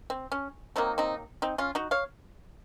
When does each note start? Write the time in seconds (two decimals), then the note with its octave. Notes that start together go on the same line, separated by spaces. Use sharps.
0.10 C4
0.32 C#4
0.76 D#3 F#3 A#3 C4 D#4
0.98 C4 D#4
1.42 C4 D#4
1.58 C#4 F4
1.75 D#4 F#4
1.91 C#5 F5